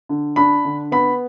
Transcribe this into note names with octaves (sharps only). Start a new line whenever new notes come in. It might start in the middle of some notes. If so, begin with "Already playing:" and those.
D3
D4 B5
D3
B3 B5